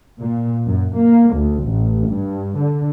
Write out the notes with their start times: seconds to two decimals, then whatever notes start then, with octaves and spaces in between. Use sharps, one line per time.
0.20 A#2
0.66 F#2
0.97 A#3
1.35 D2
1.66 A1
2.09 G2
2.58 D3